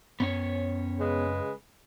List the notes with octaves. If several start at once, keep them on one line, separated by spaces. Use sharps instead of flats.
F#2 B3 C#4 C#5
C#3 G#3 B4